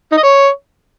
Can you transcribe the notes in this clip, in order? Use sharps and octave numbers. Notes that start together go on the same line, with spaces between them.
D#4
D#5
C#5